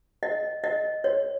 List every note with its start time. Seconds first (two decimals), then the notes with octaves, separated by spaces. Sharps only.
0.23 D#5
0.64 D#5
1.04 C#5